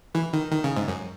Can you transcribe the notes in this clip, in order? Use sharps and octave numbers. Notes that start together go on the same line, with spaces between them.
E3
D#3
D#3
C#3
G#2
F#2